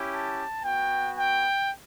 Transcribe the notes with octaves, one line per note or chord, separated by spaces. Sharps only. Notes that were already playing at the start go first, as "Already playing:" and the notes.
Already playing: C#4 E4 G4
A5
B3 F#4 G5
G5